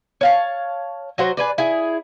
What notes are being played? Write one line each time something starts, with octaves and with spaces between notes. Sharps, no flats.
C#5 F5 A5
F#3 F#4 C5
G#4 B4 D5
E4 G#4